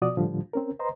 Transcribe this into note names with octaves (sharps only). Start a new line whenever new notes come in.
B2 F3 F#4 D5 D#6
A2 D3 F3 G3
C4 C#4 A#4
B4 C5 D#5 A#5 C6